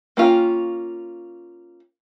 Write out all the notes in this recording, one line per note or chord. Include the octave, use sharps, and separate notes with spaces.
A#3 C#4 F4 G5